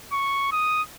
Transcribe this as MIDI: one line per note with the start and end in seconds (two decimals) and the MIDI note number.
0.12 0.49 85
0.52 0.82 87